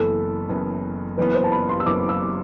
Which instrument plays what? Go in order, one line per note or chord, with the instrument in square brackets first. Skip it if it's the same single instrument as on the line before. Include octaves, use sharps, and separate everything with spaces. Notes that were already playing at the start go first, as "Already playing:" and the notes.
Already playing: [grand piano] F#1 F#2 E3 B3 [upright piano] A4
[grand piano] F#1 F#2 E3 B3
[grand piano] F#1 F#2 E3 B3 [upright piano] B4
[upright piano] C5
A5
B5
C6
E6
[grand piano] F#1 F#2 E3 B3 [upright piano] D6
[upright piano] E6